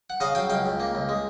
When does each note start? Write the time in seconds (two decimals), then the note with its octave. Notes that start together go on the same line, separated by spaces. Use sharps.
0.10 F#5
0.20 C#3 D#5 F5
0.35 F#3 F5 G5
0.50 C#2 F5 G5
0.66 C#2
0.80 A#3
0.95 C#2
1.09 G#3